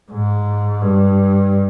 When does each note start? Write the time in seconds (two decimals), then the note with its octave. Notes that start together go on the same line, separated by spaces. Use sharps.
0.12 G#2
0.81 G2